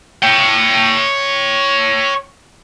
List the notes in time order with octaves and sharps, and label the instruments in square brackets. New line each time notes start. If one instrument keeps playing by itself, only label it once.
[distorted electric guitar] C#5 G5